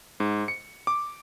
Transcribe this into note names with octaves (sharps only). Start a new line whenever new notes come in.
G#2
C#7
D6